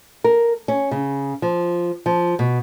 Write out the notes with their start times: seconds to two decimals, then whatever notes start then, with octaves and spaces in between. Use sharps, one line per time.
0.24 A#4
0.68 C#4
0.91 C#3
1.42 F3
2.06 F3
2.39 B2